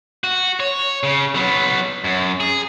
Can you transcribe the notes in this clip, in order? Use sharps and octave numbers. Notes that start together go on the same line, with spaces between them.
F#4
C#5
C#3
F#3 B3
F#2
G#4